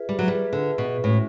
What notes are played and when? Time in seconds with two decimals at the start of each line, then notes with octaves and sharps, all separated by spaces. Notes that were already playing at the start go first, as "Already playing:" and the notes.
Already playing: F4 G#4 B4 E5
0.09 G3
0.19 F#3
0.28 G3 F4 G#4 B4 E5
0.53 D3
0.78 B2
1.04 A2 G#3 C#4 F#4